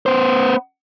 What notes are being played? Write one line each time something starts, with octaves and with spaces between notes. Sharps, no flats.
B3 C5